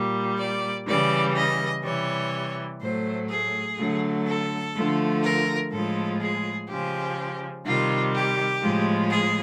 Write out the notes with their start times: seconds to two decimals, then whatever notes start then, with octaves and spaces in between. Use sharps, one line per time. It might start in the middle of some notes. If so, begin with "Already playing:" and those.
Already playing: A#2 G3
0.38 D5
0.87 C#3 E3 G3 D5
1.35 D#5
1.83 C3 E3 G3 C#5
2.81 A2 F#3 A3 C5
3.29 G#4
3.78 D3 F#3 A3
4.26 A4
4.74 D3 F3 A3
5.23 A#4
5.72 A2 F3 G#3 A4
6.20 G#4
6.68 C#3 F3 G#3 G4
7.65 C3 D#3 G3 F4
8.14 G4
8.62 A2 F3 G#3
9.10 G#4